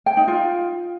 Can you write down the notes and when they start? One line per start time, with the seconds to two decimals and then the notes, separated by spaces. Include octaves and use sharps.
0.06 G5
0.17 D#4
0.28 F4